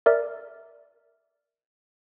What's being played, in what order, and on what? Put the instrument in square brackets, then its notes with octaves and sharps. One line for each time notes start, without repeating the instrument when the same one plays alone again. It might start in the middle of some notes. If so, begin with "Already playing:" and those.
[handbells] A#4 D5 E5